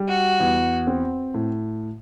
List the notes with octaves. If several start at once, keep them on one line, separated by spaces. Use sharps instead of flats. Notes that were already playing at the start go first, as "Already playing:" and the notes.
Already playing: G3
F#4
E2
C4
A2